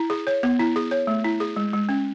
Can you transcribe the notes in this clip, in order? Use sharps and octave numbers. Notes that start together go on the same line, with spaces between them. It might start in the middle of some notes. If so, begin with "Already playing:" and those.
Already playing: E4
G#4
C#5
B3
E4
G#4
C#5
A3
E4
G#4
G#3
G#3
C#4